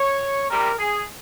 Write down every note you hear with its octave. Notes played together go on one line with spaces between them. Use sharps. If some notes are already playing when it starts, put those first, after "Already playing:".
Already playing: C#5
C3 G3 A#4
G#4